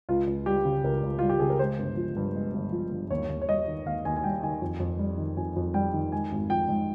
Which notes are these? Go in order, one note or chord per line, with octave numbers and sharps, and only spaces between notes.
C#2 F4
C#2
G3 G4
C#3
C#2 A#4
C#2
G3 F4
G4
C#3 G#4
A#4
G#3 C5
G1
F3
G2
G#3
G1
F3
G2
D#2 C#5
D#2
C#5
G3 D#5
D#3
D#2 F5
D#2 G#5
G#5
G3 G5
D#3 G#5
F2
F2
G3
D#3
F2 G#5
F2
G3 G5
D#3
G#3 G#5
G#1
F3 G5
G#2